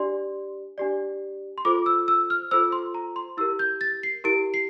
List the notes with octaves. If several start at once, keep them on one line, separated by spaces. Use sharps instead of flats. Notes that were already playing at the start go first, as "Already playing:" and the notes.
Already playing: D4 G4 D5 C6
D4 G4 D5
C6
F4 A4 C5 D6
E6
E6
F6
F4 A4 C5 E6
C6
A#5
C6
E4 G4 A#4 E6
G6
A6
C7
E4 G4 A#4 D7
C7